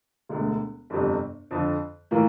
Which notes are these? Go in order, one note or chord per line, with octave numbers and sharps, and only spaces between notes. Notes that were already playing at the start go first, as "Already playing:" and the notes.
E1 D2 D3
G1 F2 C3
F2 D3 F3
A2 E3 A#3 F4